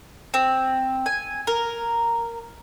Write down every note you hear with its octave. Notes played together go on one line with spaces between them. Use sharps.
C4
G#5
A#4